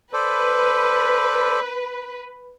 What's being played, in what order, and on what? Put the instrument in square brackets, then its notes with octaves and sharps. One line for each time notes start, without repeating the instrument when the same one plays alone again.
[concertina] A4 C5 D5 [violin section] B4